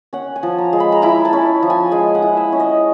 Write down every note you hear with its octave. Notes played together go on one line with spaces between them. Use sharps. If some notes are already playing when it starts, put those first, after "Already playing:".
C#4 F#5
G#5
F3
A#5
G#3
B5
A#5
E4 B5
A5
C#4
F3
G#5
G#3 G#5
F#5
E4
E5
C#4
D#5